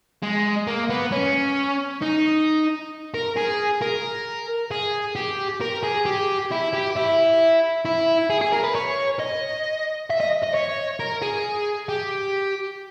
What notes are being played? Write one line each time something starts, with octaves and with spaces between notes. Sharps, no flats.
G#3
A#3
B3
C#4
D#4
A#4
G#4
A#4
G#4
G4
A#4
G#4
G4
E4
G4
E4
E4
G#4
G#4
A#4
B4
C#5
D#5
E5
D#5
D#5
C#5
A#4
G#4
G4